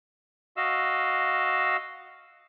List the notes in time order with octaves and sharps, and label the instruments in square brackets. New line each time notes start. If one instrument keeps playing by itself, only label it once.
[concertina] F#4 D#5 F5 E6